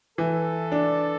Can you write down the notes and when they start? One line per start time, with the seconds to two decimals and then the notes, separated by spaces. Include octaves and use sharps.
0.18 E3 A4
0.72 D4